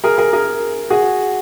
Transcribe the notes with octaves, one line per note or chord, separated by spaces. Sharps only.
G#4 A#4
G#4 A#4
G#4 A#4
F#4 G#4